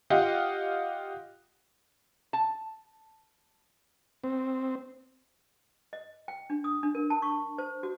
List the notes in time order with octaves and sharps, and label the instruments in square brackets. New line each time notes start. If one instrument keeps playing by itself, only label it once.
[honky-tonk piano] F4 G4 D#5 F5 F#5
[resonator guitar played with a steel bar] A5
[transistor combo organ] C4
[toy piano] D#5
G5
D4
D#6
D4
A#4
A5
C#6
C5
F#4